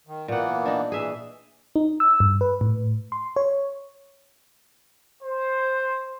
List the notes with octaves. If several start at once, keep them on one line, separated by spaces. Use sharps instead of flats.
D#3
A#2 E3 A#3 B3 F#5
D4 D#4
E3 G#4 E5
D#4
E6
G2
B4
A2
C6
C#5
C5